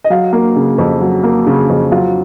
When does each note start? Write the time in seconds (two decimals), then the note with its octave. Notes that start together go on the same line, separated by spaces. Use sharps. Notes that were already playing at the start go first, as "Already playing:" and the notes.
0.04 D#5
0.10 F#3 F5
0.33 A#3
0.56 C#3
0.78 F2
1.01 F#3
1.23 A#3
1.47 C#3
1.69 F2
1.91 F#3 F4